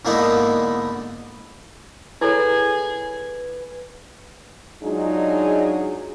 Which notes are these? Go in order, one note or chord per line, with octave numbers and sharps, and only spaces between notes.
G#2 D3 A#3 B3 D#4 E4
E4 G#4 A4 B4 C#5
F#3 G#3 D4 D#4 F4 G#4